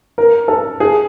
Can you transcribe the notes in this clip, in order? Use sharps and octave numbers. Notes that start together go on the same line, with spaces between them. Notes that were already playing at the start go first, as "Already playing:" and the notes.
A#4
A4
G#4